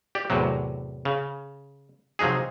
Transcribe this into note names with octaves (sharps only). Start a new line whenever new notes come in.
G4 D5
E2 A2 C3 F#3
C#3
C3 F3 F#3 D#4 G#4